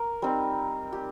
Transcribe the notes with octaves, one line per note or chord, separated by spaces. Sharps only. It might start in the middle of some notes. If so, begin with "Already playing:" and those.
Already playing: A#4
G3 C4 D#4
G4